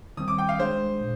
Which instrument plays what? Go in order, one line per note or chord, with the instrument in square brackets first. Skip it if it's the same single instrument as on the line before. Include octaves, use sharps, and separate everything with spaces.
[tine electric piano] D#3 G3 C4 [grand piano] D#6
[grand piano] D6
G5
F5
[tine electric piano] G#3 D4 G#4 [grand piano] C5
[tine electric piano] A#2